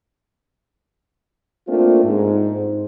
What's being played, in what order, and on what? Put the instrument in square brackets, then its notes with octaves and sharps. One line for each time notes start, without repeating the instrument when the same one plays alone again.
[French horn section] A3 A#3 C4 D4 F4
G#2